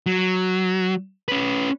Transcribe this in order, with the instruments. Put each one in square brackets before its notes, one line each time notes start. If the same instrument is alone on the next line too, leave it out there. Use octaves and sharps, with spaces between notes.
[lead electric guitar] F#3
C#4 B4